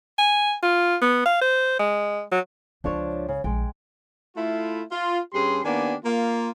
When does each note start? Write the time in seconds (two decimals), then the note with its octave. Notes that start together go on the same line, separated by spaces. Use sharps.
0.18 G#5
0.63 F4
1.02 B3
1.26 F5
1.42 C5
1.79 G#3
2.32 F#3
2.84 C#2 F3 C4 D4 C#5
3.29 C#3
3.44 A#1 G#3 G5
4.36 A3 E4 F4
4.92 F4
5.33 G2 C#4 G4 G#4 C6
5.64 D#3 A#3 B3 D4 G4 G#5
6.04 A#3 F4